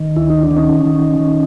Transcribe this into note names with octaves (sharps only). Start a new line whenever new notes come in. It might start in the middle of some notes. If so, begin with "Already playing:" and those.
Already playing: D#3
D2 E4
D#4
D4
D#3
C#4 D#4
D#3
D#3